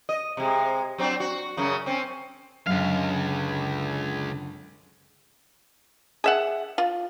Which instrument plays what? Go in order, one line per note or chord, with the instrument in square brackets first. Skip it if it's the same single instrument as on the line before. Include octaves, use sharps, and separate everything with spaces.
[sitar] D#5
C3 G#3
F#3 C4 D4
F#4
F#2 C#3 F#3
C4 C#4
[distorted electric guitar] C#2 F5 [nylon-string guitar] F#2 D3
[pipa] G#4 E5 F#5
F4